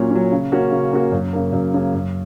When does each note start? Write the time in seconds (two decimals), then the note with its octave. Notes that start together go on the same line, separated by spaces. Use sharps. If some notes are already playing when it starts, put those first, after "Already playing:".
Already playing: A#2 F#3 C#4
0.11 F#3 C#4
0.32 C#3
0.52 A#3 C#4 F#4
0.72 C#3
0.93 A#3 C#4 F#4
1.12 F#2
1.33 C#3 A#3
1.53 F#2
1.74 C#3 A#3
1.94 F#2